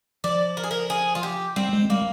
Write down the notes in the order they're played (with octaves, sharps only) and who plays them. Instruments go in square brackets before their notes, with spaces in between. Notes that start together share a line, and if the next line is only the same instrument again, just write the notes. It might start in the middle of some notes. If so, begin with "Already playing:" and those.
[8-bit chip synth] F3 [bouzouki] D5
[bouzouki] A#4
G#4
A#4
G#4
F4
G4
[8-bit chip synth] G3 [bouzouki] C4
[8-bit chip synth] G#3
[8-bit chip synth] G3 [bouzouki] A#3